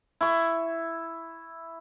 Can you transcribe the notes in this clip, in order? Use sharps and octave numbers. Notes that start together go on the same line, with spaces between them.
E4 C#6